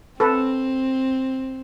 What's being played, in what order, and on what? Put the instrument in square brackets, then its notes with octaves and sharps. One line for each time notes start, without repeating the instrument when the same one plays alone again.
[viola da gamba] C4 [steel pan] A4 B4